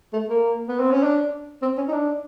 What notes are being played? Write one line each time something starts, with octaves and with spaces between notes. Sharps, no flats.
A3
A#3
B3
C4
C#4
D4
C4
C#4
D#4
D4